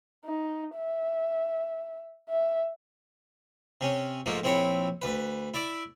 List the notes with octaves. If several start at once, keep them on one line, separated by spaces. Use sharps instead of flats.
D#4
E5
E5
C3 C#4
G#2 F3 A3 A#3
A#1 C4 E4 C#5 B5
D2 B4
E4 D5 E5